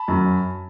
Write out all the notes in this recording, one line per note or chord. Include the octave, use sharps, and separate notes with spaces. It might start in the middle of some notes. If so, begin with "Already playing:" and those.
Already playing: A5 B5
F#2